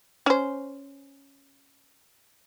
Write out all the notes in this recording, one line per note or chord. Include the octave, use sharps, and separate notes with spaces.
C#4 C5